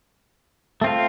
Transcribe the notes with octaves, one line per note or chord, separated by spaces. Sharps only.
A3 C4 F4